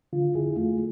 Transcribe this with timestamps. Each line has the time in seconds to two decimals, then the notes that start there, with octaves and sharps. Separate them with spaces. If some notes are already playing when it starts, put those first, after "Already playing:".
0.13 D3 F4
0.34 F2 E4 G#4
0.57 A3 F4